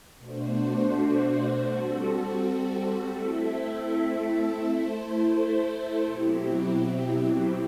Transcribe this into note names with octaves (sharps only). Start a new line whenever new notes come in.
B2 A3 D4 F#4 C5
G3 C4 F#4 A4
A3 C4 E4 A4 E5
A3 E4 A4 C5
B2 F#3 C4 E4 G4